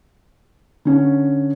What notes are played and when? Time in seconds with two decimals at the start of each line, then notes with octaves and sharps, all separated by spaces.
0.85 D3 C#4